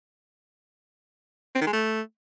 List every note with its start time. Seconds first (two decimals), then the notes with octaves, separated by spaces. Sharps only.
1.55 C4
1.61 D#3
1.67 G#3
1.73 A3